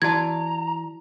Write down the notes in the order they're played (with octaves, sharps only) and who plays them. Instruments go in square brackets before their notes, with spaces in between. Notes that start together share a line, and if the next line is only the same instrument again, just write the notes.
[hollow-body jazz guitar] E3 D5 [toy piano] E4 F#4 A5 [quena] A#5 [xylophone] G#6